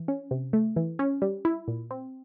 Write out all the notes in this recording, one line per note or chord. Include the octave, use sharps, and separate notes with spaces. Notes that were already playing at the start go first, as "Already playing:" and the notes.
Already playing: E3
C#4
C3
A3
E3
C#4
G3
E4
A#2
C4